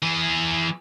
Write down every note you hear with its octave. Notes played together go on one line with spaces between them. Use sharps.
E3 G#4